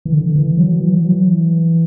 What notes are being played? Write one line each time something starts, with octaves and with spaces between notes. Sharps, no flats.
E3
D3
E3
F#3
E3
F#3
E3